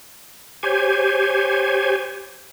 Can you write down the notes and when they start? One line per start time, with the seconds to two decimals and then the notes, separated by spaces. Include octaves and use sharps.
0.63 G4 C5 C#5 G#5